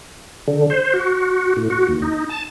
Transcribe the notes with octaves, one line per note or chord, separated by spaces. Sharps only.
D3
C5
F#4
A2
F#4
D#2
D#4
A5